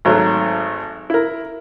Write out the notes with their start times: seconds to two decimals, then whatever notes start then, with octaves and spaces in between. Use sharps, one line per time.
0.05 G#1 F#3 A3
1.10 E4 A#4